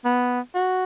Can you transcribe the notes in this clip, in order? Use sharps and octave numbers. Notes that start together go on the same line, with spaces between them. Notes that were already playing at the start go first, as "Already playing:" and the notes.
B3
F#4